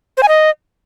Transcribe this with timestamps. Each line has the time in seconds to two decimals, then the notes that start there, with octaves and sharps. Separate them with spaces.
0.17 C5
0.23 G#5
0.28 D#5